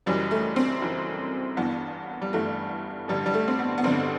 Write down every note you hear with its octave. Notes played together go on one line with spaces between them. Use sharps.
F#1 F#2 E3 G3
A3
C4
F#1 F#2 E3
G1 G2 E3 B3
G3
G1 G2 E3 A3
A1 G2 D3 G3
G3
A3
C4
B3
B3
A1 G2 D3 C4